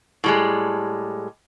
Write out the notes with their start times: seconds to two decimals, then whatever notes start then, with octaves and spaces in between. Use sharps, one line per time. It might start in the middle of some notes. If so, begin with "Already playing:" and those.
0.24 A2 G3 G#3